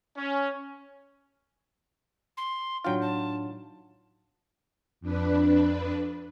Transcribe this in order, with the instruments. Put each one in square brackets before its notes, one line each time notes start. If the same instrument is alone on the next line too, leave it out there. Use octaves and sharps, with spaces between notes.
[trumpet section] C#4
[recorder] C6
[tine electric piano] A2 D4 D#4 [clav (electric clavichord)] F#3 F4 [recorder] G5
[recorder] A5
[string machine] F2 D4 B4